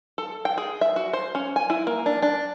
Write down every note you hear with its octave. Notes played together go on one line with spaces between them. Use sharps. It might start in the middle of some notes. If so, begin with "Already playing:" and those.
A4
G5
G#4
E5
F#4
C5
C#4
G#5
E4
A#3
D4
D4